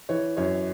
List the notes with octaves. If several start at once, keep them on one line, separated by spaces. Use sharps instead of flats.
E3 C#5
F#2 C#5